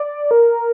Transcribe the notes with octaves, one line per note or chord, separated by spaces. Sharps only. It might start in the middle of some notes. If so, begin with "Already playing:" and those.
Already playing: D5
A#4